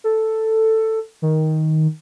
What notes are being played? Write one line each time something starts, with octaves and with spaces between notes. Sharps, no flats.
A4
D#3